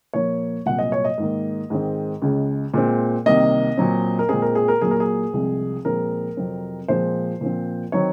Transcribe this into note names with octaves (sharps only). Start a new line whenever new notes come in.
A#2 F3 A#3 C#5
C2 A#2 F#3 F#5
D#5
C#5
D#5
G#2 D#3 A#3
G#2 D#3 G#3 C4
C#2 C#3 G#3
A#2 G#3 C4
C2 C3 D#3 A#3 D#5
A#2 F#3 C4
A#4
A#2 G#3 C4 G#4
A#4
G#4
A#4
A#2 F#3 A#3 G#4
A#4
G#4
C2 C3 F3 G#3
A#2 F3 G#3 C4 A#4
F2 C3 F#3 C4
A#2 F3 G#3 C4 C5
A#2 F3 C4
D#3 F#3 C4 C#5